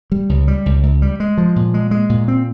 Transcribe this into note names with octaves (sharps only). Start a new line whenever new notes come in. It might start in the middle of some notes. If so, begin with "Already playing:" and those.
G3
C#2
G3
C#2
C#2
G3
G#3
F3
A#2
G#3
G#3
A#2
C4